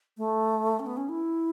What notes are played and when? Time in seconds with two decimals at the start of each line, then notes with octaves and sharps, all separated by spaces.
0.17 A3
0.80 C#4
0.86 B3
0.97 C#4
1.09 E4